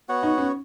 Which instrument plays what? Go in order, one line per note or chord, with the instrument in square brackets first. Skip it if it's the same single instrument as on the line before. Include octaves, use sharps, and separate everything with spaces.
[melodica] B3 F#4 C#5 F#5
[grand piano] D#4
C#4